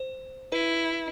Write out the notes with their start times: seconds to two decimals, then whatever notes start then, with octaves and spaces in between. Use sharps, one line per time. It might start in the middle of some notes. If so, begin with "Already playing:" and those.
Already playing: C5
0.52 E4 B4